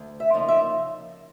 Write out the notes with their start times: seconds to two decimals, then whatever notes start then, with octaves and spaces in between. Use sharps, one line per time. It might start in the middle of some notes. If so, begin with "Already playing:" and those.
Already playing: D2
0.20 E5
0.34 C#3 F3 A#3 D#4
0.49 E5